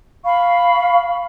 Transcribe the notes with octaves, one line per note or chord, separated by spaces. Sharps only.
F5 B5 C#6